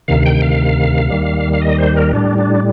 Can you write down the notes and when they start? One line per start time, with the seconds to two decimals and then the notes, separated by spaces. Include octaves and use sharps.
0.08 D2 C3 D#3 F5
0.25 G5
0.42 F5
1.10 D#2 D#3 G3
1.53 F5
1.62 D#5
1.79 C5
1.96 A#4
2.13 A2 G3 D4
2.38 D4